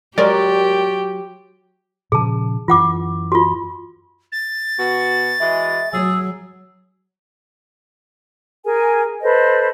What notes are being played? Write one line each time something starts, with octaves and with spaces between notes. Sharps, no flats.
F#3 G#3 G4 A#4 D5 C6 C#6 A6
A#2 C#3 F3 G#4 A5
F#2 E3 F4 F#5 D6
F4 F#4
A6
B2 F#4
E3 G#3 F#4 E5
F#3 G#4 E6
G#4 A#4 G#5
A4 B4 C5 D#5